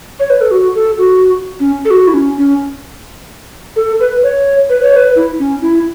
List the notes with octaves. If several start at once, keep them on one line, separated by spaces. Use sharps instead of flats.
C#5
B4
A4
F#4
A4
F#4
C#4
A4
F#4
E4
C#4
C#4
A4
B4
C#5
B4
C#5
B4
E4
C#4
E4